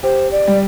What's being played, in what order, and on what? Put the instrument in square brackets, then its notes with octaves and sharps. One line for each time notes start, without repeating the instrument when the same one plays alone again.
[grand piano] G4 [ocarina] C5
[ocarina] D5
[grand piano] G3